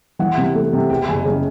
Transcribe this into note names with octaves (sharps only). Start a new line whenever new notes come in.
E3 F#5
C3
A3
C3
E2 G5
F#1 G#5
C#3